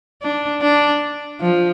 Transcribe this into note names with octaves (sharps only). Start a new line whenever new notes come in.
D4
D4
F3